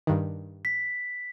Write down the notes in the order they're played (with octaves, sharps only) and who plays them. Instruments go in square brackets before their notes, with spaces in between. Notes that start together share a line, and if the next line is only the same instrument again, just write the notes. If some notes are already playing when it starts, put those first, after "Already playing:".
[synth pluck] G2 D#3
[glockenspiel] B6